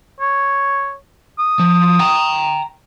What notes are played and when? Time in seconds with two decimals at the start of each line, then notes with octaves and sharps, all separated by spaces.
0.21 C#5
1.39 D#6
1.59 F3
1.99 G5 A#5